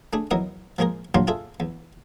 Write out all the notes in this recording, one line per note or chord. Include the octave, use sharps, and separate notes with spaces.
A3 D4 G#4
E2 F#3 E4 A#4 D#5 D#6
F3 G#3 A#3 G#4 A#4
A#2 F#3 G3 D4 F4 C6
F4 G#4 A4 E5
E2